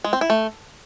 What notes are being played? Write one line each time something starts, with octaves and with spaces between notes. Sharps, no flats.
G#3
C4
E4
A3